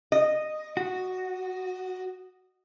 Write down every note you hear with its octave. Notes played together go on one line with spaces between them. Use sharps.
D#5
F#4